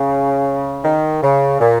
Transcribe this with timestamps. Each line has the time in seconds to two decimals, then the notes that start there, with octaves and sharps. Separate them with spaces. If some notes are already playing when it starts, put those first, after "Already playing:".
Already playing: C#3
0.84 D#3
1.23 C#3
1.60 A#2